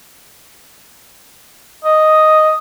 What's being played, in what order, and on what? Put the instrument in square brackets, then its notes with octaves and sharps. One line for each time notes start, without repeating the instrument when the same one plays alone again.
[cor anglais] D#5